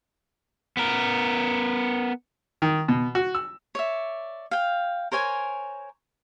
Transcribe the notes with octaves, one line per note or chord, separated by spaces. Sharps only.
B3 A#4
D#3
B2
F#4
E6
C#5 D5 E5
F5 G5
A#4 C5 C#5 G#5